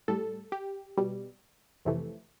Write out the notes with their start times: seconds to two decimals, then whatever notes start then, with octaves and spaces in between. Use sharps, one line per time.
0.08 A2 G3 A4
0.52 G4
0.98 B2 G3
1.85 F2 C3 E3 A3